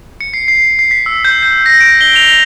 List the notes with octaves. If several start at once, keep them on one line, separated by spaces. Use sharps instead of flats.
C#7
C7
C7
C7
B6
E6
G6
G6
A#6
D7
G7
F7